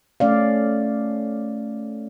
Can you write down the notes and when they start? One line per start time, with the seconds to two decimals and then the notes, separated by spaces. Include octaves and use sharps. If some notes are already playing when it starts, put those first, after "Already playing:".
0.20 A3 C#4 D5 F5